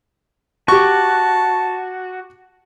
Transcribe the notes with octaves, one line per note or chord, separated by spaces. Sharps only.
F#4 G4 A5 C#6